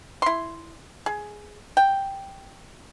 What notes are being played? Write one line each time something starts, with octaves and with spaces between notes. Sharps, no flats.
E4 C6
G#4
G5